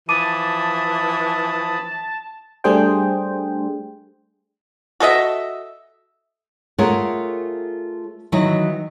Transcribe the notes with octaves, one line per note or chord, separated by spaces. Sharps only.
E3 F3 A5 B5 D6 D#6 D#7
G3 A3 D4 G#4 C5 G5
F#4 A4 D#5 E5
A3 F4 G#4 A#4 C#5 F#5
D#3 E3 F#3 E4 C#5 D#5